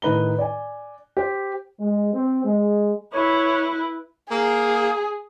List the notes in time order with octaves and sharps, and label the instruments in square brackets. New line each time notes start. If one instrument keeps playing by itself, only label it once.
[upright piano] A2 D#3 B4 A#5 G7
D5 G#5
G4 C5
[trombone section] G#3
C4
G#3
[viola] E4 B4 [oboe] C#5
[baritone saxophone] A#3 [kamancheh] G#4